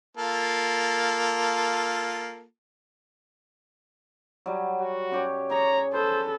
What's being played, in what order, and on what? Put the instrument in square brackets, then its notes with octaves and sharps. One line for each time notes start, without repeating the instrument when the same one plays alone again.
[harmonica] A#3 F4 A4
[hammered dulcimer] F#3 G3
[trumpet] F#4
[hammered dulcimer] F#2 G4 C#5
[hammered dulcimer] G#4 [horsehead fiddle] C#5 [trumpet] A#5
[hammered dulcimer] G#4 B4 [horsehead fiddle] A4 [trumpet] C5